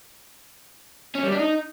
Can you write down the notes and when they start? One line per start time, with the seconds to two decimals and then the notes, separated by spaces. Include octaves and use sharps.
1.15 C#4
1.23 G3
1.31 D4
1.39 D#4